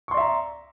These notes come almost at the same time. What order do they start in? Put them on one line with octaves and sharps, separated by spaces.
C#6 C6 D5 E5 A#5